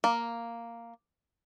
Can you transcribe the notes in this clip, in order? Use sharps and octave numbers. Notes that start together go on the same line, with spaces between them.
A#3